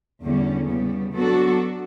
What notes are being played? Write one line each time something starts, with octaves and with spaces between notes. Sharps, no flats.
E2 D3 G3 C#4
C#3 G3 B3
F#3 B3 D4 F#4 A4